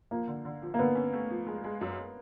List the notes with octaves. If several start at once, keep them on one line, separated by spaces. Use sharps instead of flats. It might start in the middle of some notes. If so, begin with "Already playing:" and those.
F3 A#3
D3
D3
F3
A#3
D3 B3
C#4
A3
F3
G#3
G#3
F#2